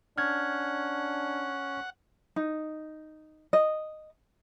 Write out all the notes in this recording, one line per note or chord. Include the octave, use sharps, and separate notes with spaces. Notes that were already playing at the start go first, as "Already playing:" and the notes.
C#4 D4 F#5 F6 G#6
D#4
D#5